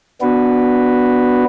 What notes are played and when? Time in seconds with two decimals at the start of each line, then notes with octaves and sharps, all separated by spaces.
0.21 B3 D4 F#4 B4